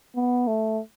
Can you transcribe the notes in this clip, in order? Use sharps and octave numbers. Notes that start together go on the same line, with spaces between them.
B3
A3